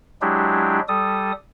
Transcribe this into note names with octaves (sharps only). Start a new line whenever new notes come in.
F#3 G#3 D4 E4 G4
G3 A4 D#6